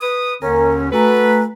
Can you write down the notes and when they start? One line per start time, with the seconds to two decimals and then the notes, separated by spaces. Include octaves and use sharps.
0.01 B4 D#6
0.42 D#2 D3 C#4 A#4 G#5 A#5
0.92 A3 F#4 A4 B4 G#5 A#5